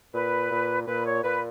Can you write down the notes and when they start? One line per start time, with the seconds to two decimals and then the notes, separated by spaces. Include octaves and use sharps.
0.14 A#2 B4
0.51 A#2
0.87 A#2 B4
1.06 C#5
1.23 A#2 B4